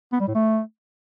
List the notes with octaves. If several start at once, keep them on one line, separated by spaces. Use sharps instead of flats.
B3
G3
A2
A3